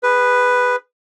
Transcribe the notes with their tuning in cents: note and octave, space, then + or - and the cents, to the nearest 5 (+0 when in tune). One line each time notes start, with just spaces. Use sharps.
G#4 -30 B4 +0